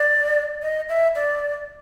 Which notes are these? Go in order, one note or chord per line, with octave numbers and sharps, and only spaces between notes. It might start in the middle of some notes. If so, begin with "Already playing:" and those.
Already playing: D5
D#5
E5
D5